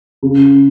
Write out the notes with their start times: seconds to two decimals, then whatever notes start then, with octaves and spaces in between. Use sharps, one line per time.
0.23 C#3